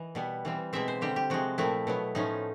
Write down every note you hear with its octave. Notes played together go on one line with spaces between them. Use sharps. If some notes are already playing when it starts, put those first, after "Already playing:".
Already playing: E3 D#5
B2 G3 B3
E3 G3 C4
B2 G#3 C4 E5
C5
D3 G3 C4 G4
G4
C3 F3 G#3 F#4
A#2 F3 A3 C4 E4
B2 F#3 B3
A2 F3 A3 C#4 D#4